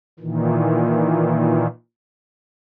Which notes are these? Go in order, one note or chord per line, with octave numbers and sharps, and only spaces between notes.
A#2 D#3 E3